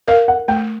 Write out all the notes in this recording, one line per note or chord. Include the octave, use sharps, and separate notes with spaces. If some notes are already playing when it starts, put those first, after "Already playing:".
A#4 F5
F#5
A3 G5